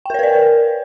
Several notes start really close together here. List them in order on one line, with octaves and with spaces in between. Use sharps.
G5 A#4 C#5 B4 D5